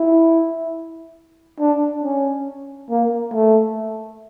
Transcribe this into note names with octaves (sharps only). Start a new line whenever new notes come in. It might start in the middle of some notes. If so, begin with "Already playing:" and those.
Already playing: E4
D4
C#4
A#3
A3